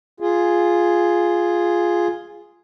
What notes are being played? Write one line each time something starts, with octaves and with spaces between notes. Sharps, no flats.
F4 G#4